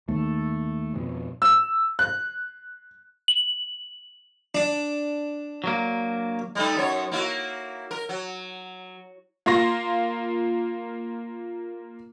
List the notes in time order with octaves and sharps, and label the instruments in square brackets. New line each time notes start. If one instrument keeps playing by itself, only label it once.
[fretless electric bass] D#2 [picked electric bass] A3
[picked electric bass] F2 B2
[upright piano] E6
F#6
[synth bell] F#7
[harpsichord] D4
[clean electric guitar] F#3 A#3
[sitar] G3 A3 D#4
F#2 C#5
A#3 E4 F#4
A#4
F#3
[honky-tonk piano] A#3 F4 F5 C6 A#6